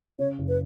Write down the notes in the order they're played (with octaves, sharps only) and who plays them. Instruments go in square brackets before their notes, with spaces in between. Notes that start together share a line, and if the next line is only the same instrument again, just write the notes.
[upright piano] C#3 [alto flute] C#5
[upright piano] F#1
[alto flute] B4